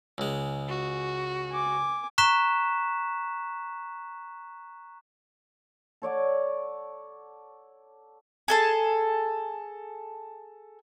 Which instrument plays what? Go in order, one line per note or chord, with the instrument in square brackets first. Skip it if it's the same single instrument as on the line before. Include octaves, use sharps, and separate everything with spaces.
[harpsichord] C#2 G#3
[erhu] F#4
[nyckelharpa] G#5 D6
[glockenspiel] A#5 C#6 F#6 B6 E7
[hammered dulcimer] A4 C#5 D5 F#5
[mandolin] G#4 A4 A5